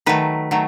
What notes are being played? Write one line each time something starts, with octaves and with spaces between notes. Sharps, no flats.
D#3 F#3 A3 B4
D#3 F#3 A3